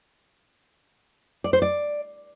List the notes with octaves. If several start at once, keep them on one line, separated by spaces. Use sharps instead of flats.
D5
C5
D5